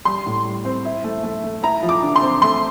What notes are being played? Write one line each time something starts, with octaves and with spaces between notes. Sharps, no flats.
G3 C6
A2
G3
C4
E4
A3
A3
A3
E4 A#5
F3
D6
D3
C6
C4
A3 C6